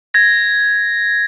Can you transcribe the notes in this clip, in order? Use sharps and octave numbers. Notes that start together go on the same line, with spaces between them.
G#6 A#6